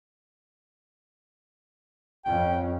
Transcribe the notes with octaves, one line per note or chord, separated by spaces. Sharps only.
F2 C#4 G5